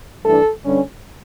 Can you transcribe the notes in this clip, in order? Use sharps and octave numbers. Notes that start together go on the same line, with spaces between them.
G2 E3 A3 D4 A4
G2 D3 G3 C#4